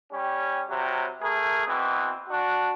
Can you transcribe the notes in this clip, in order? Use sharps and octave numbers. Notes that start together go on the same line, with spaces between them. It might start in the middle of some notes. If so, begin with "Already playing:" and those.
G3 C#4 G4
C3 F#3 G3
A3 G#4 A#4
B2 E3 C4
D4 F#4